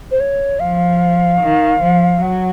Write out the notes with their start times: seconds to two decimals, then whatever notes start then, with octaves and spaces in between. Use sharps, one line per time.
0.11 C5
0.20 C#5
0.60 F3 F5
1.41 D#3
1.81 F3
2.21 F#3 F#5